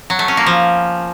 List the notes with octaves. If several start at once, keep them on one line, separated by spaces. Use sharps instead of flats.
F#3
A3
C#4
A#3
F3